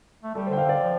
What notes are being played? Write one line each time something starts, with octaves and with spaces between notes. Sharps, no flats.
A3
G3 A4
C5
D3 G5
F5
D3 D5
F3